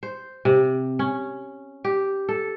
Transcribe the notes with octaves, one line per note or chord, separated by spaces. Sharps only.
C5
C3
C#4
G4
A4